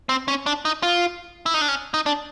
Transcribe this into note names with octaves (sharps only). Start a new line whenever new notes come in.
C4
C#4
D4
D#4
F4
E4
D#4
D4
C#4
D#4
D4